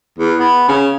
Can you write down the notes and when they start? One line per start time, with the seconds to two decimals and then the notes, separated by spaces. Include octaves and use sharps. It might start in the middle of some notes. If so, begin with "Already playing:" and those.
0.18 E2
0.40 B3
0.68 C#3